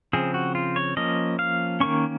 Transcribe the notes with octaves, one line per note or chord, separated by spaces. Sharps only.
C#3 F3 C4 G#4
F#4
F4
C#5
F3 A#3 C#4 D#5
F5
D#3 A#3 C#4 C#6